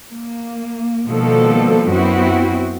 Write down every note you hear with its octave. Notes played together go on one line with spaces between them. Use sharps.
A#3
B2 D#3 F3 G3 A#3 A4
F#2 B3 C4 E4 F#4